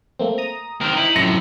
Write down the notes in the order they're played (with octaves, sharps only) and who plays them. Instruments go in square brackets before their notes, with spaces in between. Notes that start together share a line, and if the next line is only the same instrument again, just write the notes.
[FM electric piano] A3 A#3 C4
A#5 D#6
[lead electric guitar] D#3 C4 [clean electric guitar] A#4 C5
[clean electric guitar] D#4 [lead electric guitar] E4
[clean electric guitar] F#2 A2 [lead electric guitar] C3 F3 [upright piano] A#6 C#7